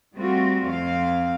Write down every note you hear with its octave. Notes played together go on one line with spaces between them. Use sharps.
G3 A3 C4 F4 F#4
F2 C4 F5